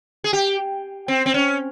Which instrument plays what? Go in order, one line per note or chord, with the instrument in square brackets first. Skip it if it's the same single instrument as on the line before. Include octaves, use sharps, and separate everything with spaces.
[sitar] G#4
G4
C4
C4
C#4